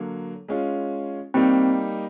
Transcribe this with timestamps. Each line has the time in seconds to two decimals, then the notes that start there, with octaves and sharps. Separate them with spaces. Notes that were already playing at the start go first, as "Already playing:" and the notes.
Already playing: D3 F#3 A#3
0.49 G#3 C#4 F4
1.34 G3 A#3 C4 D#4